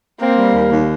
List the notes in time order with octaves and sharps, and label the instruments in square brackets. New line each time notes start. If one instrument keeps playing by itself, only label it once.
[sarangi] A#3 [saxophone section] C4
[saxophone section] G3
D#2
D#2